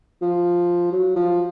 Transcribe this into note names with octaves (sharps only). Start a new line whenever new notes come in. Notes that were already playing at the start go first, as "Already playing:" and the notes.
F3
F#3
F3